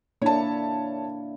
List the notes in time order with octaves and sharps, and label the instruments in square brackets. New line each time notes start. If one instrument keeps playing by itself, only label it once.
[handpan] A#3 D4 E4 [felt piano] C#5 A5